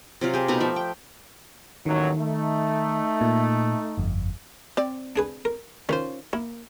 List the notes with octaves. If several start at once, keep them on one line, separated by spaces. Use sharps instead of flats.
C3 F#3 F4
G4 G#4
B2 A3 D#4 A#5
F3 D5 E5
G5
A1 D#2 D#3 F#3
A3 D#4
A#2
G1 F2
C4 D5
D4 G#4 B4
A#4
D#3 C#4 F4 C5
A#3 E4